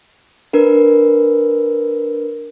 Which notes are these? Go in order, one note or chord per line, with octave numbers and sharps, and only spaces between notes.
D4 A#4 B4